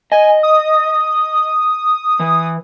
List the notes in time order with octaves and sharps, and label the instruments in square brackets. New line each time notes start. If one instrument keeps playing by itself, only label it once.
[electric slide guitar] D#5 [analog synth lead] G#5
[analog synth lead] D#6
[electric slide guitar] E3